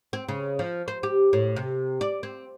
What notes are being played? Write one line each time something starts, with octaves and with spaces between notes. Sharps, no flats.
C4
C#3
F3
C5
G4
A2
C3
D5
C4